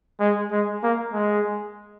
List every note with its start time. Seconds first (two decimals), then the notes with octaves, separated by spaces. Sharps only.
0.20 G#3
0.52 G#3
0.83 A#3
1.13 G#3